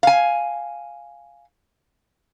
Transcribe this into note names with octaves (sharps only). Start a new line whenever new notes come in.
F5 G#5